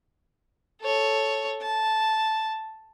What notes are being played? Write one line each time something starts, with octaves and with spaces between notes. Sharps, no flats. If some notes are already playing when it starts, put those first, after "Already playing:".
A4 C#5
A5